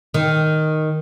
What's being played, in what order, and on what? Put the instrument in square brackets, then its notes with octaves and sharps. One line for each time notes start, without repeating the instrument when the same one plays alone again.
[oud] D#3